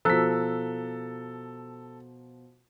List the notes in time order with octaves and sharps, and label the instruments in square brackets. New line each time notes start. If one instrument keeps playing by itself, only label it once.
[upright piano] B2 F3 [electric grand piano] A4 B6 [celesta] A#5 E6 F#6